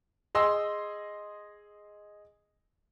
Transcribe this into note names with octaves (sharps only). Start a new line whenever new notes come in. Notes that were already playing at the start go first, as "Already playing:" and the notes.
G#4 D#5 C6 E6